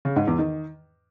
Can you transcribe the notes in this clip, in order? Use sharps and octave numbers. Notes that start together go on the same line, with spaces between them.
C#3
G#2
E2
D#3